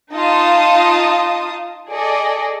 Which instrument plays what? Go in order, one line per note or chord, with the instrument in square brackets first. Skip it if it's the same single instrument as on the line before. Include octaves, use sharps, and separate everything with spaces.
[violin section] D#4 F4 A5 D#6
G#4 A4 D5 D#5